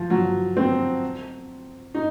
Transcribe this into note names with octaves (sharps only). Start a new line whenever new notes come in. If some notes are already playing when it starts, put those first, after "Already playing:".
Already playing: F3
F#3
C4
D#4